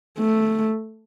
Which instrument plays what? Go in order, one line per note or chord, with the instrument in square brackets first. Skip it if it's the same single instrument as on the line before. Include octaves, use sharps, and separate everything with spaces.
[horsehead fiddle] A3